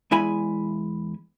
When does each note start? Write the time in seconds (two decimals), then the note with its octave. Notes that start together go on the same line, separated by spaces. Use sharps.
0.11 E2 G#3 E4 G#5 B5